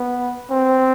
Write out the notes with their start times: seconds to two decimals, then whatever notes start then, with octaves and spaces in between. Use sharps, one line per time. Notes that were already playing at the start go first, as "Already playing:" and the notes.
Already playing: B3
0.51 C4